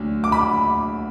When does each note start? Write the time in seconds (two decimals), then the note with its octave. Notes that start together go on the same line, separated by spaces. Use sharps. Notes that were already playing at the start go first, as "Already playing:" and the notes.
Already playing: D2 F#3 D4
0.24 D6
0.32 B5